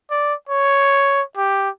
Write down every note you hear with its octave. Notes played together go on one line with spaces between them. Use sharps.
D5
C#5
G4